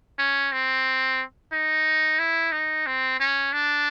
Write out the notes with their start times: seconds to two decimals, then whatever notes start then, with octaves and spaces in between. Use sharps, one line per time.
0.19 C#4
0.52 C4
1.52 D#4
2.19 E4
2.52 D#4
2.87 C4
3.20 C#4
3.53 D4